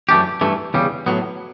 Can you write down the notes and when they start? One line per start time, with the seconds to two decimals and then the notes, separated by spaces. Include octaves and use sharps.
0.09 F#2 E3 A3 D4 G4
0.41 G2 E3 A3
0.74 E2 C#3 G3
1.06 A2 F#3 B3